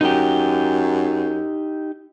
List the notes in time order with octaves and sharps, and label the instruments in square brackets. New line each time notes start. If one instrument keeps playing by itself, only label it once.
[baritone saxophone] F#2 [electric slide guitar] D#4 G4